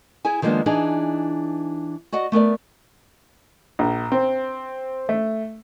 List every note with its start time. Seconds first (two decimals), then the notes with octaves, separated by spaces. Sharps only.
0.25 E4 G#4 G#5
0.42 D#3 F3 G#3 A#3 B3 D4
0.66 E3 D4 D#4 G#4
2.12 F#4 D5 D#5 F#5
2.32 A3 B3 A#4 D5
3.79 A#1
4.12 C4
5.09 A3